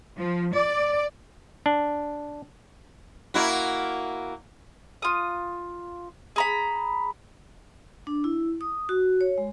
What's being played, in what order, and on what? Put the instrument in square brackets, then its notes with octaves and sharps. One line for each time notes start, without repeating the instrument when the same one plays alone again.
[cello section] F3
D5
[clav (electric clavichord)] D4
[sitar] A#3 E4 F#4
[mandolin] F4 D#6
G#4 A#5 B5
[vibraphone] D4
E4
D#6
F#4
C#5
G#3